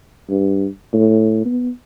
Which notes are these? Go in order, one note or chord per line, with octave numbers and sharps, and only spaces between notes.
G2
A2
B3